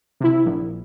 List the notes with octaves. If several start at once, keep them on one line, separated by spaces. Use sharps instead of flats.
C3 E4
A#1